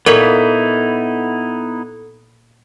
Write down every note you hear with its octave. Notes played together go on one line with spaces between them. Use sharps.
A#2 B3 D#4 E4 A4 C#5